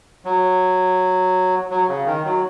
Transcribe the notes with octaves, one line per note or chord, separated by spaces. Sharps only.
F#3
F#3
C#3
D#3
F#3